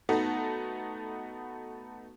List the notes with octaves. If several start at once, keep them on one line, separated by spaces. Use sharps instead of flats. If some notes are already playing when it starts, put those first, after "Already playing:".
A3 B3 D#4 F#4 A4